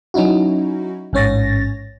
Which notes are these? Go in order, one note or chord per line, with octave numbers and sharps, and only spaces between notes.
F#3 C#4 D#4 E4 F#4
A1 G#2 C#4 C#5 A6 A#6